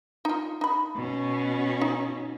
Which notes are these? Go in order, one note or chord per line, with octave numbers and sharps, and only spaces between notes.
D#4 F4
D#4 B5
B2 C#4
D#4